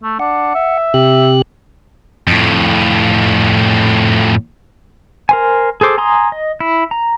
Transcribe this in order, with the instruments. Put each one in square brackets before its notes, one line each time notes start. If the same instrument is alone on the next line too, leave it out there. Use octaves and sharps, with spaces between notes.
[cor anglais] A3
[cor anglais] D4 [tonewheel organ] F#5
[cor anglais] E5
[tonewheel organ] C3 G4 F#6
[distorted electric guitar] F2 A2
[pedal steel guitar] A#4 C5 G#5
G#4 A4 C5 D6
G#5 A#5 C6 D#6
D#5
E4
A#5